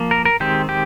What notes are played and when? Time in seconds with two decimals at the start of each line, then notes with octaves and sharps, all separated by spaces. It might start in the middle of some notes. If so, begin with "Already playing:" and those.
Already playing: F3 A#3
0.11 A#4
0.25 A#4
0.40 D#3 G#3 C4 G4
0.69 G4